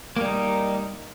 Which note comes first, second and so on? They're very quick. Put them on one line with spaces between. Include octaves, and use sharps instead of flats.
A#3 G3 D#4